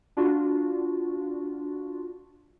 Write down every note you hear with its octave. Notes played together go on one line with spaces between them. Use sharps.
D4 F4 F#4